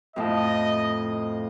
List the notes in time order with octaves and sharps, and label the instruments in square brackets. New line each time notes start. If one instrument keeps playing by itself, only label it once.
[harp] F2 A2 A5 [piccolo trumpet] D#5